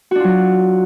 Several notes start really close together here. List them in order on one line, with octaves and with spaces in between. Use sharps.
F#4 D4 F4 F#3